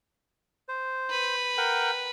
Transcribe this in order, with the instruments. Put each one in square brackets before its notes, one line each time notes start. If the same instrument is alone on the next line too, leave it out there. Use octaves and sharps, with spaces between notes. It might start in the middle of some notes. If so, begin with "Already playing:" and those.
[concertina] C5
[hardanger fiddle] B4
[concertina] A#4 F#5 G5